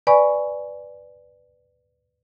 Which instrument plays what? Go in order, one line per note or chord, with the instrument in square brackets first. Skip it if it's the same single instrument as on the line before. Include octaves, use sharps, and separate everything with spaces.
[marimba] B4 D5 G#5 B5 C#6